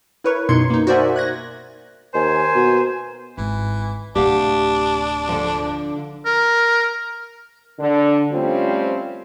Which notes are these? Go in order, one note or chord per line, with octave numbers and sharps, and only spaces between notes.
E4 A#4 B4 C#5 C#6
F#2 B2 D#4 C6 G#6 C#7
A#3 D#4
F#4 A#4 C5 D5 E5 G#5
F#6 G#6 A#6
D#2 A#4 C5 G#5
B2
G#1 E3
D1 C3 D4 G4 F5 F#5
D3 F3
A#4
D3
F3 G3 A3 C4 C#4 F4